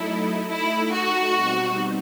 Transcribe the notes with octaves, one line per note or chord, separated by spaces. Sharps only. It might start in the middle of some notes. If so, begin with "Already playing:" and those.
Already playing: F#3 A3 D#4 E4 A4 D#5
A3 D#4 E4 A4
F#4
B2 G3 C4 D#4